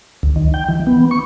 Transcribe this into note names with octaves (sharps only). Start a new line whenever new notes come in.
D2
D#3
G5
E3
B3
C#6